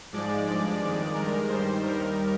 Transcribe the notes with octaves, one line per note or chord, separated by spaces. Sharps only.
G#2 F3 G#3 D5
G2 F3 G#3 D5
F2 D#3 G#3 D5
G2 D#3 G#3 A#4
G2 D#3 G3 C5
D#2 D#3 G3 A#4